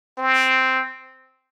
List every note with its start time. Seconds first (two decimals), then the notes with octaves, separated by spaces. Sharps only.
0.18 C4